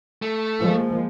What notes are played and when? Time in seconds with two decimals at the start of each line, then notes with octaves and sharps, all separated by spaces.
0.22 A3
0.61 F3 G#3 A#3